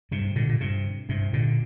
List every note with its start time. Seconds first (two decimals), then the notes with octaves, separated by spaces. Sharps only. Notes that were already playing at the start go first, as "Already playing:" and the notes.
0.11 G2 C3
0.35 A#2 D3
0.49 A#2
0.60 G2 C3
1.09 G2 C3
1.33 A#2 D3